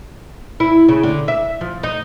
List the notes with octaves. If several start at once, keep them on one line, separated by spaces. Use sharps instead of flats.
E4
C#3
D3
E5
F3
D#4